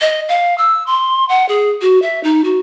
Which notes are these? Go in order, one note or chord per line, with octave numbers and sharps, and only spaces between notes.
D#5
F5
E6
C6
F#5
G#4
F#4
E5
D#4
F#4